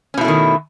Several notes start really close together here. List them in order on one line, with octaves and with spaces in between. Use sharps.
C#4 B2 E4 A3 D#3